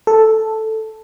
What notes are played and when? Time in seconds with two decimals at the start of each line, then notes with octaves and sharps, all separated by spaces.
0.07 A4